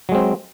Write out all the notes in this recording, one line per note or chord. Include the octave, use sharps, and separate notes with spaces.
F#3 G#3 C4